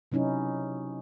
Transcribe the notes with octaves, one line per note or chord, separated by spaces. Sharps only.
C3 F#3 C#4 D#4 E4